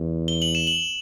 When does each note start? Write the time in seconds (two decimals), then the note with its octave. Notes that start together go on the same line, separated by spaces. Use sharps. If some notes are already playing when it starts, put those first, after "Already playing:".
Already playing: E2
0.28 G7
0.42 F#7
0.55 E7
0.67 F#7